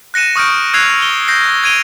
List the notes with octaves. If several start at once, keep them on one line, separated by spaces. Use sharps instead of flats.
F#6 A#6 C#7 D#7 E7
C#6 D#6 F6 G6 D7
E6 F#6 G#6 C7 F7
G7
G6 A#6 C7
G#6 D7 D#7 F7 G7